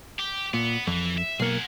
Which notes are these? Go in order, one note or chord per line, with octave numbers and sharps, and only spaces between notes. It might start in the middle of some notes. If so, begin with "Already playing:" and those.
G4
A#2 B3
F2 E3
E5
B1 A#3 G#4 F#5